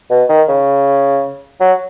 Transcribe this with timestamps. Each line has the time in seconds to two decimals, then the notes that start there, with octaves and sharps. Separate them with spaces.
0.11 B2
0.29 D#3
0.48 C#3
1.60 F#3